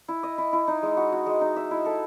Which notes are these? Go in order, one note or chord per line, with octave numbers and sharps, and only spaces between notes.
E4
D#5
E4
E4
D#4
G#3
F#4
F#4
G#3
D#4
E5
E4
A4